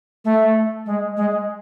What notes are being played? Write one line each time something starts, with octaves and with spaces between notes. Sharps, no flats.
A3
G#3
G#3